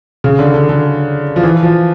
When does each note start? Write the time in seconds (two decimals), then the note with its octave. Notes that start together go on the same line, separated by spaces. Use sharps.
0.24 C#3
0.39 D3
0.54 D3
0.69 D3
1.36 F3
1.43 E3
1.63 F3